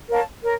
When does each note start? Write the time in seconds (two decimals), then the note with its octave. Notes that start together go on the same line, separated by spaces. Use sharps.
0.09 A#4 C#5 F5 A5
0.43 A#4 C#5